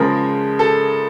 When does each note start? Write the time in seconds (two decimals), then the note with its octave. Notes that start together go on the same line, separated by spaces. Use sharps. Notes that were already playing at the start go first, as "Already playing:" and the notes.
Already playing: C#3 F3 G#3 A#4
0.59 A4